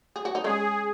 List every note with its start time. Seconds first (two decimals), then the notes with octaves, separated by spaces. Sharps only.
0.16 G#4
0.25 F#4
0.35 D#4
0.44 G#3 C#4 G#4